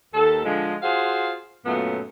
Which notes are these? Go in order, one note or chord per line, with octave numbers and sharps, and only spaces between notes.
D#2 A4
D3 F3 G#3
F4 F#4 G#4 C5 F5
F#2 A#2 F#3 A3 B3